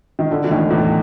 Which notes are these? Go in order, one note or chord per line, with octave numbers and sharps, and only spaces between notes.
D#3
D3 D4
E3
D#2 D#3 A3
E2 A2 E3